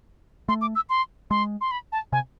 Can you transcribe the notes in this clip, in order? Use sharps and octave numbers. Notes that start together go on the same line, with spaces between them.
A3 C6
D6
E6
C6
G#3 C6
C6
B5
A5
C3 G#5